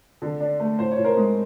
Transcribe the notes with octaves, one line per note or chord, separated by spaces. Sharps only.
D3
D4
A3
A2 C5
C#5
A2
A#4 C5
G#3